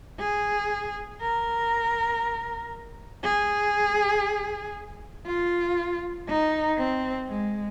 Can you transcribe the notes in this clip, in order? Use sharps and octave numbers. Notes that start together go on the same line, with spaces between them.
G#4
A#4
G#4
F4
D#4
C4
G#3